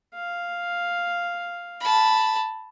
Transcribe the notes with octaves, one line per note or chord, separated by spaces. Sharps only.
F5
A5 B5